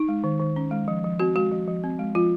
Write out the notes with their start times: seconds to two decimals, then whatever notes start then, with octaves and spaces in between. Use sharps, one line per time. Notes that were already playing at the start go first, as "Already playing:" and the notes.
Already playing: D#4
0.09 G#3
0.24 D#3
0.40 D#3
0.56 C#4
0.71 G#3
0.88 F3
1.04 F3
1.20 C4 F#4
1.35 G#3 F#4
1.52 F3
1.67 F3
1.84 C4
1.99 G#3
2.15 F3 F4